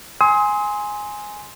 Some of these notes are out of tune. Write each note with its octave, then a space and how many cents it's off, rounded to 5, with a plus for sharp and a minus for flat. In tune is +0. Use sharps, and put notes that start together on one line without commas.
G#5 +0 C6 +0 D#6 +40